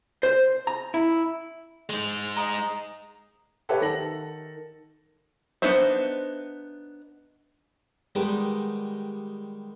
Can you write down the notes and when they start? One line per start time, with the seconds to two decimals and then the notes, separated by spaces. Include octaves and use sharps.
0.23 C5
0.67 A#5
0.94 E4
1.90 G#3 D#4
2.37 D#5 A#5
3.69 G4 A4 B4 C#5 E5 F#5
3.81 D#3 A4 A#6 F#7
5.62 B3 D4 D#4 C5 E5
8.15 D#3 G3 G#3 B3 D#4 G4